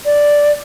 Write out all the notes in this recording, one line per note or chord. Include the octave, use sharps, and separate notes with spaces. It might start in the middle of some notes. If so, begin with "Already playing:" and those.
D5